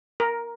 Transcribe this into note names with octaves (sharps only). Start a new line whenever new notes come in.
A#4